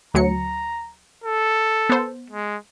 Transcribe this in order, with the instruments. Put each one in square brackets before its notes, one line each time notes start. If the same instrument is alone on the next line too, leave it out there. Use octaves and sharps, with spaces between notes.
[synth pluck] D2 F#3 C#7 [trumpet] A#5
[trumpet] A4
[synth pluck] B3 C5
[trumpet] G#3